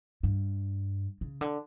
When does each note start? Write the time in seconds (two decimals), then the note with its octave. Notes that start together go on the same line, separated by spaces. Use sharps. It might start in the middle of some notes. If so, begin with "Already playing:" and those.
0.23 G2
1.21 C#3
1.41 D3